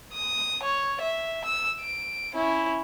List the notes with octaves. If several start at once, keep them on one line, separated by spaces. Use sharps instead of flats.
D#6
C#5
E5
E6
D7
C#4 E4